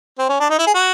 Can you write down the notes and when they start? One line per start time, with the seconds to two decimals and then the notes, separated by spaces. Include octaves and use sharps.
0.19 C4
0.29 C#4
0.40 D4
0.50 D#4
0.58 E4
0.67 G#4
0.74 F#4